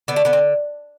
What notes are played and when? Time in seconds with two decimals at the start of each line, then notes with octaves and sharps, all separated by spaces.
0.08 D3 B3
0.16 A3
0.25 D3 B3
0.33 C4